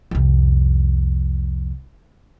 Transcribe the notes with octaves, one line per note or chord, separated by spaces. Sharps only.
C2 F2